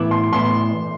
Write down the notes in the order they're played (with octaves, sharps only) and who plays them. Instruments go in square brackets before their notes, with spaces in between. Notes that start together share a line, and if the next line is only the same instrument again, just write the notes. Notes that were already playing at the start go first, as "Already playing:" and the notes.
Already playing: [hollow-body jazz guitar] A2 E3 B3 E4 [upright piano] D6
[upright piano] C6
[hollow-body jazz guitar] A2 E3 B3 E4 [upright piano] C6